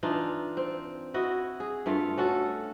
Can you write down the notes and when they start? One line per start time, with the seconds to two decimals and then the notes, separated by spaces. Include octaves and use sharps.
0.03 E3 D4 D#4 F4
0.57 C4
1.14 E4 F#4 D#5
1.60 G#4
1.86 G2 A3 F4
2.18 C#4 F#4 A4